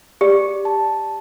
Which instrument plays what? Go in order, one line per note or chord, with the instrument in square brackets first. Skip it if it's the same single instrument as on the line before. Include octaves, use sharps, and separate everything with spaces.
[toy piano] G4 [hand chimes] D5
[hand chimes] A5